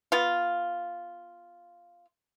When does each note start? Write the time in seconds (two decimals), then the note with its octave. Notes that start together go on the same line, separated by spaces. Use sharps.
0.12 B3 F4